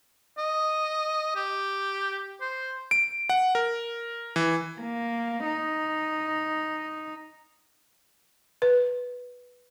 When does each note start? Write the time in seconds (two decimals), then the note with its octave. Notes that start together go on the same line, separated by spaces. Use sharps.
0.38 D#5
1.36 G4
2.41 C5
2.91 D7
3.30 F#5
3.55 A#4
4.36 E3
4.81 A#3
5.46 D#4
8.62 B4